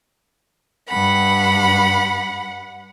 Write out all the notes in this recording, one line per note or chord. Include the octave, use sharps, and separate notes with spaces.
G2 F#5 B5